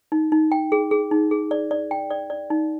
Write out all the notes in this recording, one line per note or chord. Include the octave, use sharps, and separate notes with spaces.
D#4
D#4
G5
G#4
G#4
D#4
G#4
D5
D5
G5
D5
D5
D#4